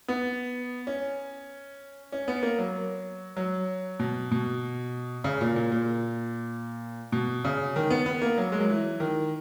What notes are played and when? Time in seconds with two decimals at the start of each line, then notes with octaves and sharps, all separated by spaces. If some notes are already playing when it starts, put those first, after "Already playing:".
0.08 B3
0.87 C#4
2.12 C#4
2.28 B3
2.43 A#3
2.58 F#3
3.37 F#3
3.99 B2
4.31 B2
5.24 C#3
5.41 A#2
5.56 A#2
5.72 A#2
7.12 B2
7.45 C#3
7.76 D#3
7.90 B3
8.06 B3
8.22 A#3
8.38 F#3
8.52 G#3
8.61 F#3
8.70 E3
9.00 D#3